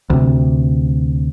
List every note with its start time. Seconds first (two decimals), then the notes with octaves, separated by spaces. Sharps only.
0.10 D2 C3